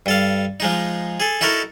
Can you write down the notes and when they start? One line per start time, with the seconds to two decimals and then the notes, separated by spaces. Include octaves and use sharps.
0.06 G2 A4 F5
0.60 F3 G#3 D#4
1.20 G#4 A4
1.41 D#4 E4 F#4 A4 A#4